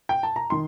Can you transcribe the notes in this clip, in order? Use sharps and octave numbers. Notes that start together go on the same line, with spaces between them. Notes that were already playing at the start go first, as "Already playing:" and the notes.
G5
A5
A#5
D#3 C6